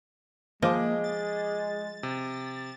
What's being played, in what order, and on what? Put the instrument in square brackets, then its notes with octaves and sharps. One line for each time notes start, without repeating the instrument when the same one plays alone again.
[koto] F3 [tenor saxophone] G#3 [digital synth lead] A#3 [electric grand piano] D#5 D6
[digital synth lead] A6
[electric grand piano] C3